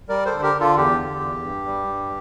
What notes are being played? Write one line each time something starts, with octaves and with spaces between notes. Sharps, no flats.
G3 A#4 D5
A4 C5
D3
G4 A#4
D3
F4 A4
E2 G4
D3
E2
G2
G3
G2